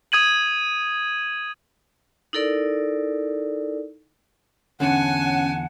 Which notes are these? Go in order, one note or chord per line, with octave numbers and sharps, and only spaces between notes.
D#6 G#6 D#7 F#7
D#4 E4 A4 A#4 D5
E2 D3 C#4 F#5 G#5 A5